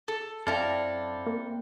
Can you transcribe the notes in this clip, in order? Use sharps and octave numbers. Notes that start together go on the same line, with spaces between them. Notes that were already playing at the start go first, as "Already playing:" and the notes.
A4
F#2 C4 D4 E4 A4 F5
A#3